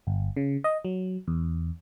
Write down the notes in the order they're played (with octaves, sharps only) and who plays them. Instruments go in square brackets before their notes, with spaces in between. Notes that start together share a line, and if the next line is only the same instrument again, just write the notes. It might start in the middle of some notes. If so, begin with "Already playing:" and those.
[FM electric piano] G1
C#3
D#5
F#3
E2